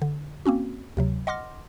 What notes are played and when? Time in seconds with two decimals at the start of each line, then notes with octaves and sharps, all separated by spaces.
0.02 D3
0.46 A#3 C4 C#4 F#4
0.97 D2 C3 F#3
1.27 D#5 F#5 C6 D6 F6 A#6